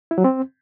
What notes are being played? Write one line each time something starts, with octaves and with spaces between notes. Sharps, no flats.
E4
F#3
C4